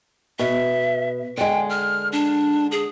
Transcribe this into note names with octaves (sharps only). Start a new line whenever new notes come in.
B2 E5
D3 G#3 G5
F6
D4
G#4